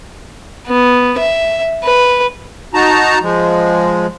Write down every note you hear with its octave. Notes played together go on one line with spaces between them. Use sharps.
B3
E5
B4
D#4 F#4 A5 A#5
F3 G#3